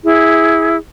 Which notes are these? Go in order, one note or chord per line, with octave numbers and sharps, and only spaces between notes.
E4 G#4